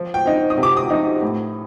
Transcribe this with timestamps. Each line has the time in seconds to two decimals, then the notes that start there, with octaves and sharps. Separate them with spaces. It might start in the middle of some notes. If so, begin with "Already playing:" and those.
Already playing: F3
0.14 G5
0.26 C4 D#4
0.50 D#6
0.58 C3
0.63 D6
0.77 D#6
0.90 F3 C4 D#4
1.22 A2